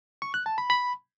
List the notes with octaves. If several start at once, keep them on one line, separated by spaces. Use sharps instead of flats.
C#6
F#6
A5
B5
B5